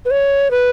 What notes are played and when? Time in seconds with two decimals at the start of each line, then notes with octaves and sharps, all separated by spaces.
0.05 B4
0.11 C#5
0.51 B4